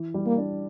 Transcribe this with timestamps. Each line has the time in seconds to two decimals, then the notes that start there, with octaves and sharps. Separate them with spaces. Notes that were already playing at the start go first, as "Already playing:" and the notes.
Already playing: E3
0.14 G3
0.26 A#3
0.38 D4